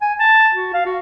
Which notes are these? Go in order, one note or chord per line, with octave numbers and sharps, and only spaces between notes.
G#5
A5
F#4
F5
F#4